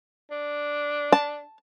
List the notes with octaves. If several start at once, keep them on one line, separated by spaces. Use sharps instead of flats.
D4
A5